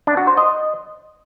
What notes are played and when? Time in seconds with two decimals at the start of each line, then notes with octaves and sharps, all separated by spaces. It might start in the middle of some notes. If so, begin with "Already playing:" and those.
0.07 D4
0.17 F#4
0.27 C5
0.37 D#5